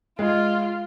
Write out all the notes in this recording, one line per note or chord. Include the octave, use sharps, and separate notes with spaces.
G#3 F4